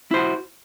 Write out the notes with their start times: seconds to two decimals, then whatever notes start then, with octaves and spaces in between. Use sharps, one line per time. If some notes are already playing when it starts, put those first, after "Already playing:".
0.11 E4
0.14 C5
0.17 F#4